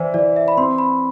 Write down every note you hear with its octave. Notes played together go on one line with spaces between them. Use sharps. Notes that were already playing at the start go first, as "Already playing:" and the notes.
Already playing: E3 E4 C5 D5
E3 D5
E5
B5
C4 C6
B5